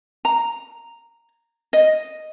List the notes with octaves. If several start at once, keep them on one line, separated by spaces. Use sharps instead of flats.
A#5
D#5